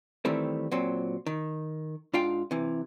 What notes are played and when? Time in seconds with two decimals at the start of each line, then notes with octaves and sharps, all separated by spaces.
0.25 D#3 E3 G3 A3 C4
0.71 A#2 F#3 C4
1.27 D#3
2.14 G#2 D4 F4 F5 G5
2.51 C3 E3